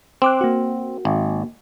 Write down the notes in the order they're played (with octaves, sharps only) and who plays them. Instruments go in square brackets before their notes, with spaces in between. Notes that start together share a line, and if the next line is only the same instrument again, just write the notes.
[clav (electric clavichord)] C4 [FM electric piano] C6 D6 F#6
[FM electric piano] A#3 F#4
[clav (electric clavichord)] G#1